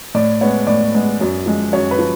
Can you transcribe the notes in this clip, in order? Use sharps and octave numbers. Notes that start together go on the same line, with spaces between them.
A2 D5
G#3 B3 C#5
A2 D5
G#3 B3
F#2
F3 G#3
F#2 C#5
B4
F3